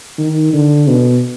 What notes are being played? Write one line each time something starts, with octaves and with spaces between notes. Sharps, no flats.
D#3
D3
B2